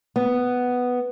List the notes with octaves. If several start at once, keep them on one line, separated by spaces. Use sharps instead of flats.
B3